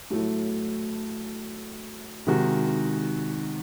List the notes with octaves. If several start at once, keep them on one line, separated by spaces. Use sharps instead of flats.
A2 F#3 A3
C3 D#3 G#3 D#4 F#4